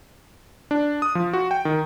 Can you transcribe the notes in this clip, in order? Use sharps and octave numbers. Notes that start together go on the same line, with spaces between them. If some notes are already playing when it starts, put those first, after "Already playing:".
D4
D#6
F3
F#4
G5
D#3